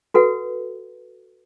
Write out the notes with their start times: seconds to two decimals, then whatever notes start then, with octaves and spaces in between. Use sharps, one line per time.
0.14 F#4 A4 B4 F#5